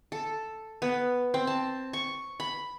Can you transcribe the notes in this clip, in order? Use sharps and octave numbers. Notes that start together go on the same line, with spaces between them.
A4
B3
C4
A5
C#6
B5